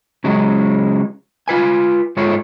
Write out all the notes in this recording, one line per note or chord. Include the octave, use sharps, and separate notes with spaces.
C#3 F#3 G#3 C#4
F4 B4 G#5
G#2 G#3 F4 A4 C#5